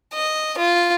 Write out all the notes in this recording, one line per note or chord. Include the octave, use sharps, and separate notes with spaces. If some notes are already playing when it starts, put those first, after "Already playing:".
D#5
F4